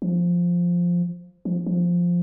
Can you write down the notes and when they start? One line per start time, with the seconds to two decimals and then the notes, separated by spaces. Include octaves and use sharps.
0.02 F3
1.45 F3
1.66 F3